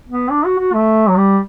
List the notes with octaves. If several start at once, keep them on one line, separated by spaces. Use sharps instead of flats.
B3
D4
F#4
F#4
A3
F#3
G3